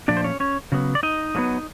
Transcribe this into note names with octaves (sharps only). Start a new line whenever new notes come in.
A#2 F3 A3 D4 D5
C5
C#4 C#5
C#4 C#5
C#3 F#3 B3
D5
D#4 D#5
A2 F#3 B3